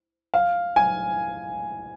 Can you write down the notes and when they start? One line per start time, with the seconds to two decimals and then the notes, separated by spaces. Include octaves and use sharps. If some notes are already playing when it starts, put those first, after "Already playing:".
0.34 F5
0.76 G#5